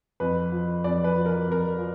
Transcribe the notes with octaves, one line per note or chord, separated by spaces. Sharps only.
F2 B4
F3
F2 D5
B4
F3
A#4
F2 A#4
F3